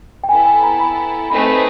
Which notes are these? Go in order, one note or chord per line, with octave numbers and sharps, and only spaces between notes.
G5
B3 E4 A4 G#5
G#5
A#5
B5
A3 C4 D#4 G#4 B4 B5